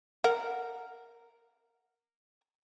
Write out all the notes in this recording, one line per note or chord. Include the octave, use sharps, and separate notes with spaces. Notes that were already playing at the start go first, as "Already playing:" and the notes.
A#4 F#5